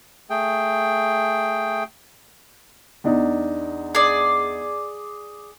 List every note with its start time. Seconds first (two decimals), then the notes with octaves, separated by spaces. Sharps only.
0.30 A3 G#4 G5
3.04 E2 D4 D#4
3.95 G#4 D5